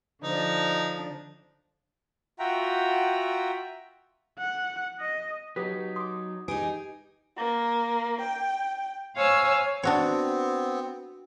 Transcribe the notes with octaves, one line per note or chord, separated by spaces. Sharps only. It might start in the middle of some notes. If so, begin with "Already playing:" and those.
D3 F3 D4 D#4
F4 F#4 E5 F#5 G5 A#5
F#5
D#5
F#3 D#4 G4 B4 D#6 B6
C6 D6 D#6
D#4 G4 G#4 B4 D7
A#3
G5
C5 C#5 F5 G#5 E6
B3 C4 D4 F#4 C#5